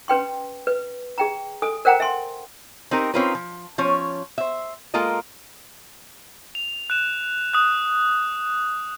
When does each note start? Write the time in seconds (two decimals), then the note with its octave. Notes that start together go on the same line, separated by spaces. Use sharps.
0.08 C#4 B4 G5 C6
0.67 B4
1.18 G#4 G5 A#5
1.62 A4 G#5 D#6
1.85 A#4 C5 F#5 G5 A#5
2.00 E5 G#5 C6
2.91 C4 D#4 G4 A#4
3.14 C4 C#4 D#4 F4 A#4 B4
3.35 F3
3.78 F3 C#4 C#5
4.38 C5 E5
4.94 G#3 A#3 F4 A4 A#4 D#5
6.55 F7
6.90 F#6 E7
7.54 D#6 F#6